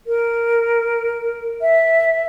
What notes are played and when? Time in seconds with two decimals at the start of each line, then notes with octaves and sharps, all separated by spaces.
0.07 A#4
1.62 E5